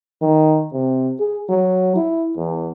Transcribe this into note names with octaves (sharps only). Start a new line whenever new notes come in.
D#3
C3
G#4
F#3
E4
E2